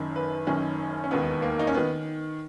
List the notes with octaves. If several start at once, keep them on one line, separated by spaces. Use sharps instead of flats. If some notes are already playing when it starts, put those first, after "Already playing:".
Already playing: F#1 F#2 D#3
B4
F#1 F#2 D#3 C#4
C#4
E1 D#2 D#3 B3
A#3
D#4
C#4
D#3 B3